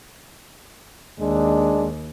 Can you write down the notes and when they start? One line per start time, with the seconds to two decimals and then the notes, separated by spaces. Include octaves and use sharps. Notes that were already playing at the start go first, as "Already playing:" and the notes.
1.20 D#2 G#3 D4